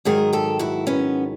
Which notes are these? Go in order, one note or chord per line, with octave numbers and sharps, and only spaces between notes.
G#2 D#3 F#3 G#4 A#4
G4 A4
E4 F#4
B3 C#4